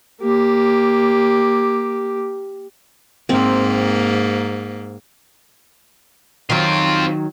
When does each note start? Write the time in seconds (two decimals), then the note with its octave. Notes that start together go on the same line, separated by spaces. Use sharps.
0.22 A#3 G4
3.29 G#2 A#3 C4
6.50 D#3 F#3 C4 F4